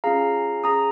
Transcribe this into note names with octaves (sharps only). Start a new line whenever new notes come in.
C#4 F4 G#4 F5 A#5
C#4 G#4 A#5 D#6